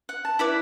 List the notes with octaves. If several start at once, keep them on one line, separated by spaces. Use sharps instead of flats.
F#5
A5
E4 B4 D5 B5